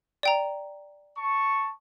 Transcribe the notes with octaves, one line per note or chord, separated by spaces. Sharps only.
D5 G5 A#5
A5 C#6